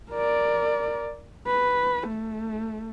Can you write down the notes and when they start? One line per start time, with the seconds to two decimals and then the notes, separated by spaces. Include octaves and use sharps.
0.11 A#4 D5
1.47 B4
2.07 A3